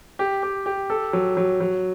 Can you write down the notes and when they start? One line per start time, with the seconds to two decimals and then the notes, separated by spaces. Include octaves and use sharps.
0.19 G4
0.43 G4
0.66 G4
0.90 A4
1.13 F#3
1.37 F#3
1.60 F#3